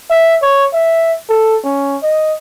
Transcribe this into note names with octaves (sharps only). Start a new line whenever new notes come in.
E5
C#5
E5
A4
C#4
D#5